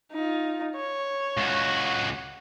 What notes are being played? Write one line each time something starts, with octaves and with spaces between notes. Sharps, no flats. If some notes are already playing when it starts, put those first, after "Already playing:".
D#4 F4
C#5
C#2 F#4